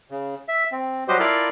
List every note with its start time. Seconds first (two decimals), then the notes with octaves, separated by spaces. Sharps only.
0.10 C#3
0.48 E5
0.72 C4
1.08 F#3 G3 F#4 G4 C5 D#5
1.19 E4 F4 A4 A#4 D5 F5